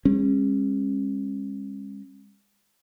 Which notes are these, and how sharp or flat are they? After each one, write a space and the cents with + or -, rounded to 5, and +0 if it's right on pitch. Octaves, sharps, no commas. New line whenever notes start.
G#3 -40 C#4 -35